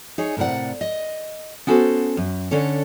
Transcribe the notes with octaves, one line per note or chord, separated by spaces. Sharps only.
D#4 G#4 C#5
A2 C3 A#4 D5 F#5
D#5
B3 C#4 F#4 A4 C5
F#2
D3 C#4 D4 A4 C#5